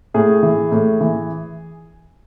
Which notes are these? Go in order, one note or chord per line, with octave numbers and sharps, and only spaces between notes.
A2 G#4
E3
A2
E3